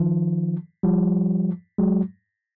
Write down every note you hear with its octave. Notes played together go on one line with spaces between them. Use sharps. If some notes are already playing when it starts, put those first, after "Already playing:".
Already playing: D#3 F3
F3 G3
F#3 G#3